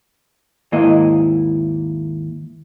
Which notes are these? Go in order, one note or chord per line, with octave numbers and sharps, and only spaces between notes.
D#2 G#2 A#3 E4 D#5